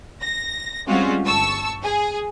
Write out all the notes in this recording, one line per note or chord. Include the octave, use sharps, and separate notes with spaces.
A#6
G3 G#3 C4 C#4 F4 F#4
G1 A5 C#6 E6
G#4